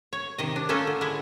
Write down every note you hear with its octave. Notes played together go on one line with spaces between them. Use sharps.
C#5
C3 D#3 D#5
D4
A3 A#3 C#4 F4 A4
D3
G#3 E4